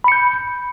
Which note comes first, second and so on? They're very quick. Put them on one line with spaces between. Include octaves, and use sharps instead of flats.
B5 C#7 G6